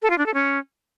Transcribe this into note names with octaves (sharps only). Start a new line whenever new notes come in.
A4
F4
D4
A4
C#4